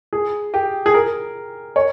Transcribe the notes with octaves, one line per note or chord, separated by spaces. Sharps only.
G#4
G4
G#4
A#4
C#5